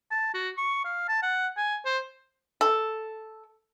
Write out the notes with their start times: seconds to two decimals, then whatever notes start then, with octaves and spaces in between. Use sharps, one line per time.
0.11 A5
0.34 F#4
0.57 C#6
0.85 F5
1.09 A5
1.23 F#5
1.57 G#5
1.86 C5
2.61 A4